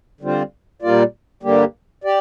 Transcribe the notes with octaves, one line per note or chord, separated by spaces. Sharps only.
D3 G3 C4 F4 C5
A#2 G3 A#3 F4 D5
G2 D3 G3 A#3 G4
G4 D5